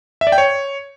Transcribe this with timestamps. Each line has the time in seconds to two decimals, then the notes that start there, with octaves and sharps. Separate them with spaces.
0.21 E5
0.27 D5
0.32 G5
0.38 C#5